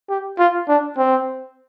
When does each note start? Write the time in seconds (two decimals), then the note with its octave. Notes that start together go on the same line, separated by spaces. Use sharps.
0.10 G4
0.39 F4
0.68 D4
0.98 C4